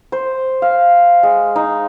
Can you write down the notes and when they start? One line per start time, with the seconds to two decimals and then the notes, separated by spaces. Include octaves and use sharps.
0.12 C5
0.62 F5
1.23 G#3
1.56 D#4